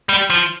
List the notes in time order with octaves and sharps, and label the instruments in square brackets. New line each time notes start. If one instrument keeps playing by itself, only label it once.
[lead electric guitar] G3
F3